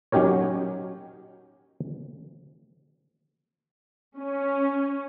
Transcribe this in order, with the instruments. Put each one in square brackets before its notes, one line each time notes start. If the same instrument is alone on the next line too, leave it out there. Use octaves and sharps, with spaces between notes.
[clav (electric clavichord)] F#3 C#4 D#4 G4 A#4 C#5
[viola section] C#4